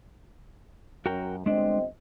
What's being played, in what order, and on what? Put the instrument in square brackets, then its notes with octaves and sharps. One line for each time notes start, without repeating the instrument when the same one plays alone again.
[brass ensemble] F#2 [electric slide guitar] F#4 A#4 G5
[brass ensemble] G1 C4 D#5 [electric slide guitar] G#3 D4